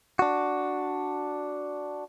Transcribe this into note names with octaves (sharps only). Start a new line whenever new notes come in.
D4 F#4